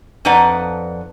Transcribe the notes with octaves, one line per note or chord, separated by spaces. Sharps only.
F2 F3 D#4 B4 D5 F#5